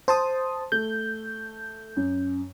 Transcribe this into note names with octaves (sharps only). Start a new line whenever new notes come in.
C5 A5 C6 D#6
A3 G6
F#2